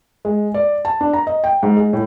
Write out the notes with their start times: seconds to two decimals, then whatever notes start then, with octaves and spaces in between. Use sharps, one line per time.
0.25 G#3
0.54 D5
0.85 A5
1.01 D4
1.13 A#5
1.27 D#5
1.44 G5
1.63 G#2
1.77 G#3
1.93 A2